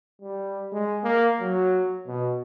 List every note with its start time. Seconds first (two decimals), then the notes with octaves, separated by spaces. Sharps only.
0.22 G3
0.73 G#3
1.04 A#3
1.40 F#3
2.07 B2